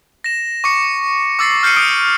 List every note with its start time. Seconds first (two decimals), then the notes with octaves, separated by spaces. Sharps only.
0.24 A#6 E7
0.64 C#6 D6 C#7
1.39 D6 E6 A6 C7
1.63 F6 G6 C7 C#7 D#7
1.76 D6 D#6 D7